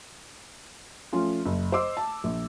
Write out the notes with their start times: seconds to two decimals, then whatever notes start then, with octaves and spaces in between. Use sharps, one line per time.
1.13 F3 A3 C#4 F4
1.46 F#1
1.72 C5 D#5 D6 E6
1.97 A5
2.24 A#1